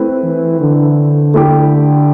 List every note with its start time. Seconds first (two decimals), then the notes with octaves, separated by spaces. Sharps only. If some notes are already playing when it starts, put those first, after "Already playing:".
Already playing: A3 C4 E4 B4
0.24 E3
0.61 D3
1.34 A3 E4 G4